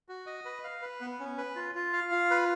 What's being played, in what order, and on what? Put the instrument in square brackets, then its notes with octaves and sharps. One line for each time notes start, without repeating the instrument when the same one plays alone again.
[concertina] F#4
D#5
B4
F5
B4
B3
C#4
B4
F4
F4
F5
F4
B4